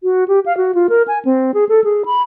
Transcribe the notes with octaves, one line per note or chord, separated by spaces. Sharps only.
F#4
G4
F5
F#4
F4
A#4
G#5
C4
G#4
A4
G#4
B5